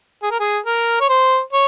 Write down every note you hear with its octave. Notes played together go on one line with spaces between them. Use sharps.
G#4
A#4
G#4
A#4
C#5
C5
C#5